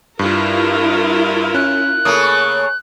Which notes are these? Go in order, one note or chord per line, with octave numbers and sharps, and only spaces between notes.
G2 E4 F4 A#4
C#4 F#6
C#3 A3 A#3 D#6